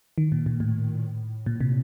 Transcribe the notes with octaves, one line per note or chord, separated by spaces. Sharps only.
D#3
A#2
A#2
A2
A#2
C3